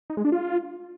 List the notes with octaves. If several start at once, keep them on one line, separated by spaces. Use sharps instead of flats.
D#4
G#3
D4
F4